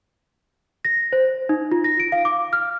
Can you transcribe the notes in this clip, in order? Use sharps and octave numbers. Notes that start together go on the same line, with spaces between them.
A#6
C5
D#4
F4
A#6
D7
F5
D6
F6